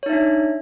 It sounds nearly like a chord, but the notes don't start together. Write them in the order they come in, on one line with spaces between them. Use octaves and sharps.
C#5 D#4 E5 D4